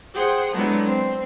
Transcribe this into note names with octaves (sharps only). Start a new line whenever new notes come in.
G#4 C5 F#5 G5
F#3 G#3 A3 B3 D4 E4
C4